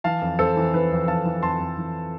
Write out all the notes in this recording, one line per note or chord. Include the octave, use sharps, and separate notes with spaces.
E3 F5 A5
F2
F2 A4 C5
E3
E3 B4
F2
F2 F5 A5
E3
F2 A5 C6
F2
E3